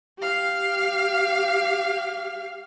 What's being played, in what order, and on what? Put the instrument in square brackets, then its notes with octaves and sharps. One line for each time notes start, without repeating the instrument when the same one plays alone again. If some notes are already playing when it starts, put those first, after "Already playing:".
[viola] G4 F5